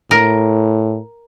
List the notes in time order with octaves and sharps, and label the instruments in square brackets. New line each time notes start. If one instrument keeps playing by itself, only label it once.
[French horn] A2 [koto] A#4